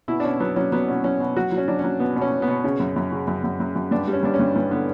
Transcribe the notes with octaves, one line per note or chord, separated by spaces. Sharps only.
B2 E4
D4
B2 C#4
F#3 B3
F#3 C#4
F#3 B3
B2 C#4
F#3 C#4
B2
F#3 F#4
F#3
C#4
F#3 D4
C#4
F#3
B2 B3
B2
C#4
B2
B3
B2
C#3 C#4
F#2
F#2
C#3
F#2
F#2
F#2
F#2
G2 D4
G3
C#4
G2 D4
C#4
G2
G2
D3 B3